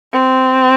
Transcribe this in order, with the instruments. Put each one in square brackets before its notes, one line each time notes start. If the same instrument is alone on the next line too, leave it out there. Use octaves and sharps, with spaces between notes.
[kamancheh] C4